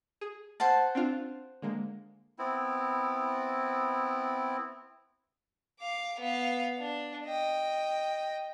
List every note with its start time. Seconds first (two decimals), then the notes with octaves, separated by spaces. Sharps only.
0.21 G#4
0.60 C5 F#5 A5
0.95 C4 D4 F4
1.62 D3 G#3 A#3
2.39 B3 C4 E4
5.79 F5 D6
6.19 B3 F5
6.78 D4
7.25 D#5 G5